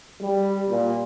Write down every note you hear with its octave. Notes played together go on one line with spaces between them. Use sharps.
G3
A#2